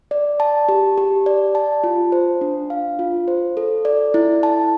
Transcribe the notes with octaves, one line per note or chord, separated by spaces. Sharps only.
D5
A5
G4
G4
D5
A5
F4
C5
D4
F5
F4
C5
A4
D5
E4
A5